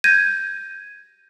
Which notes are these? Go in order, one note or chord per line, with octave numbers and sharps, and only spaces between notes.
G6 G#6 A#6 D#7